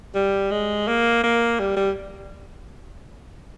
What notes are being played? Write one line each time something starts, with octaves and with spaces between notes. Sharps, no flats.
G3
G#3
A#3
A#3
G3
G3